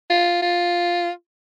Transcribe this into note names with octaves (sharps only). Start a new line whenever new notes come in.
F4
F4